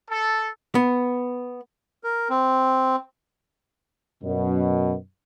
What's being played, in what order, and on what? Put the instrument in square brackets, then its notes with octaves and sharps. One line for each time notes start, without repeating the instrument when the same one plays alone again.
[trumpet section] A4
[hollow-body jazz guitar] B3
[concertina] A#4
C4
[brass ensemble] F#2 B2